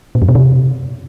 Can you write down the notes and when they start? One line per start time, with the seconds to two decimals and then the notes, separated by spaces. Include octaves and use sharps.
0.15 A#2
0.22 F2
0.28 B2
0.35 C3